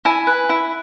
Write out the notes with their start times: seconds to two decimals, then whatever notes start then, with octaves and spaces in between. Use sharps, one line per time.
0.05 E4 G#5
0.27 B4
0.49 E4